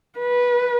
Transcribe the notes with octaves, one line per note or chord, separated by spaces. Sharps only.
B4